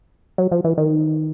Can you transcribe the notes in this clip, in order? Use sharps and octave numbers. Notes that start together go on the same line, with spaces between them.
F#3
F3
E3
D#3